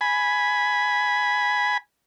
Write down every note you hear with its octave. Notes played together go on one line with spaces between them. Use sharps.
G#5 B5